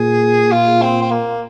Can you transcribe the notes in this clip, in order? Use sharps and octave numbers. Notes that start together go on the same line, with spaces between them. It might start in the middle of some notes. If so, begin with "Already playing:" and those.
Already playing: A#2 G#4
F4
C4
C4
A#3